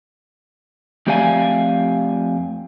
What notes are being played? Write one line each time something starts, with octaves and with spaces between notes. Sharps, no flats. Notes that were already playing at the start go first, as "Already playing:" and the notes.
F2 A3 G4 D5 F5 G#5